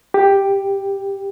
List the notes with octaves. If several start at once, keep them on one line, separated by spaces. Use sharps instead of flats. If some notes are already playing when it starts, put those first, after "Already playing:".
G4